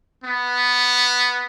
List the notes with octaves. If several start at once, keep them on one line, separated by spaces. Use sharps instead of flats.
B3